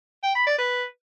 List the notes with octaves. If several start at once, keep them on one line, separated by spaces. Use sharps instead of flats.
G5
B5
D5
B4